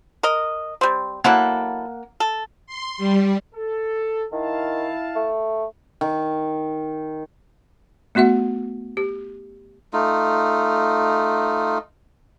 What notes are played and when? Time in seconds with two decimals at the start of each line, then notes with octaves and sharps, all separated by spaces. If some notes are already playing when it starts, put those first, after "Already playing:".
0.23 A#4 D#5
0.81 G3 C4
1.24 F#3 A#3 E4 A4 F#5
2.20 A4
2.66 C6
2.98 G3
3.55 A4
4.32 D#3 E4 F5 A5
5.15 A3
6.01 D#3
8.15 A3 B3 F#4 E5 F#5
8.97 G4
9.93 A3 D#4 F4